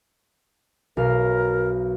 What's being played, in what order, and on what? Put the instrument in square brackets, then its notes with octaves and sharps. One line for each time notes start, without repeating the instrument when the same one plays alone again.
[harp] B1 F5 [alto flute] A#4